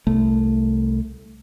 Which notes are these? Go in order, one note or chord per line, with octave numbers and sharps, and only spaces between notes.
C2 A3